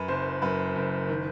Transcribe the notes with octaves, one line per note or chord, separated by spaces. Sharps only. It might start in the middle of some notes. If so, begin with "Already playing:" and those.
Already playing: F#2 B4
F#1 C5
F#2 B4
F#1
D#3